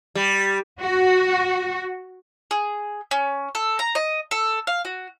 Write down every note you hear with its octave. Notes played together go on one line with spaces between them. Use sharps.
G3
F#4
G#4
C#4
A4
A#5
D#5
A4
F5
F#4